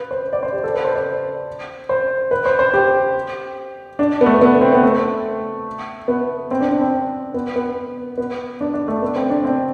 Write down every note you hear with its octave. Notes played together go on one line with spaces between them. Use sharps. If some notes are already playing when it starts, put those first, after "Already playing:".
Already playing: B4
C5
D5
C5
G4
A4
B4
C5
D5
C5
B4
C5
C5
G4
D4
B3
A3
B3
C4
B3
A3
B3
C4
D4
D4
C4
B3
B3
B3
D4
D4
A3
B3
C4
D4
C4